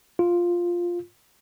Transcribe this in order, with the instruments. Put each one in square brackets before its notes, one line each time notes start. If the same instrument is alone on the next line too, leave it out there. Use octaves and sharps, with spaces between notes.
[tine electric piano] F4